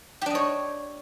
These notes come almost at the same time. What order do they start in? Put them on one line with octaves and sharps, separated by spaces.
G4 D4 D#5 C#5